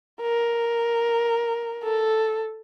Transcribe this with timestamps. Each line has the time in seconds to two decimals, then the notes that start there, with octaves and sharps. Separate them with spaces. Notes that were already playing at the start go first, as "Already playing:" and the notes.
0.21 A#4
1.84 A4